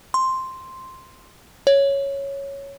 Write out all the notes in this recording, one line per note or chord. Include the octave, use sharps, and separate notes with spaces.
C6
C#5